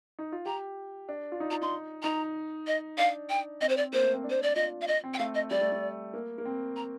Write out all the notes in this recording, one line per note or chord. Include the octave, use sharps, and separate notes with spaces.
D#4
F4
G4 A#5
D4
F4
D#4
F4 A#5
D#4 C6
D#4 A#5
D#5
D4 F5
G5
C4 D#5
C5
D5
A#3 C5
A3
C4
D4
C5
D5
F4 D#5
F5
D#5
C4
G5
A3 F5
D#5
G3 D5
A3
A3
A#3
A#3
C4
A#5